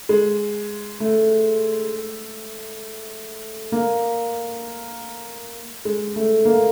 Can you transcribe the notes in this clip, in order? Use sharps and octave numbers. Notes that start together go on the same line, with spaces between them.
G#3
A3
A#3
G#3
A3
A#3